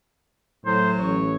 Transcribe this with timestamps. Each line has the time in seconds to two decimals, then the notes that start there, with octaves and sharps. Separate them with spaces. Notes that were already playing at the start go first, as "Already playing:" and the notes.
0.66 A2 F#3 C5
0.99 A1 C#5